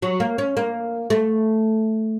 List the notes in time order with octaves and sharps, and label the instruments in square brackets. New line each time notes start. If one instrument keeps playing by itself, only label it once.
[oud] F#3
A#3
C#4
A#3
A3